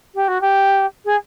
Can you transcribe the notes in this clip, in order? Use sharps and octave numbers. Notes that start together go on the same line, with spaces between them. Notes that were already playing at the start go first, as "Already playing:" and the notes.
G4
F#4
G4
G#4